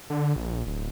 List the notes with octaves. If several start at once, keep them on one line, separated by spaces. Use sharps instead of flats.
D3
A#1
D1